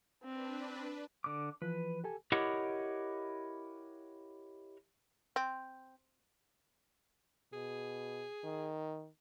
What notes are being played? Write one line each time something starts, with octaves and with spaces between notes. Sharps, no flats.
C4 D4 B4
D3 D6
E3 F3 B4
G4 A4 G#5
E4 G4 A#4 C#5 D#5 F#5
C4
B2 G#4
D#3